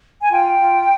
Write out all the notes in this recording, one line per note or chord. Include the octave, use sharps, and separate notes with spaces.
G#5
F4 G5
F4